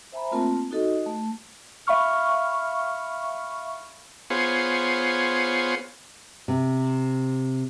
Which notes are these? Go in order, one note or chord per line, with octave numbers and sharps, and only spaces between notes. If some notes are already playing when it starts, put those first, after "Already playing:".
C5 E5 G#5 A#5 B5
A3 A#3 C4 F4 A#4 A5
D#4 F#4 A4 D#5
A3
E5 F5 B5 C#6 F6
B3 F4 G#4 C5 C#5
C3